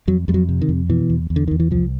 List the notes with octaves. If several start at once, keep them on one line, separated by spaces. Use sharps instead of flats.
F2 F#3
F2 G3
F#3
C3
D#3
F2
B2 E3
E2
E2
D3
E2 D#3
E3
C2 F3